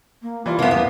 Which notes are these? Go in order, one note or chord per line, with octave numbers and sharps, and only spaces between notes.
A#3
E3 G3 F4 D5
C2 A2 C3 A#3 B3 F5
E2 G2 B3